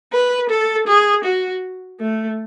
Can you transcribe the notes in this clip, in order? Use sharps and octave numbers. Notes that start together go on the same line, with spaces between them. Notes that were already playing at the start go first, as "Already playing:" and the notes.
B4
A4
G#4
F#4
A3